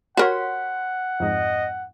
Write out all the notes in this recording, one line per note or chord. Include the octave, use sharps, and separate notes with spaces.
F#4 A#4 C#5 F#5 C6 B6
F2 G#2 D#5